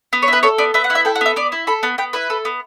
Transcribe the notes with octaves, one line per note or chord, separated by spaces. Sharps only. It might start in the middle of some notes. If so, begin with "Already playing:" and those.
B3
C#5
E4 B4
A4 C#5
B3 D5
B3 E5
F#5
E4
E5
A4 G5
F#5
B3 E5
B3 D5
E4
A4 B5
B3 A5
B3 G5
E4 B4
A4
B3